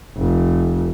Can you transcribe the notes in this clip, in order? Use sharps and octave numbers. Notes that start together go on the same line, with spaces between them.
F1